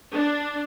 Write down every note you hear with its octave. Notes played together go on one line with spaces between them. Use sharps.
D4